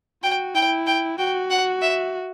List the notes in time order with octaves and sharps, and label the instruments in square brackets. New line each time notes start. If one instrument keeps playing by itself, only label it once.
[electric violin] F#4 [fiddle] G5
[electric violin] E4 [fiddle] G5
[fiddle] G5
[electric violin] F#4 [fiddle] G5
[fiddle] F#5
E5